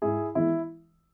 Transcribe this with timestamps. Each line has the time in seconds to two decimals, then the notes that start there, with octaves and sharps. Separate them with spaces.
0.02 G#2 E4 G#4
0.35 E3 G#3 B3 E4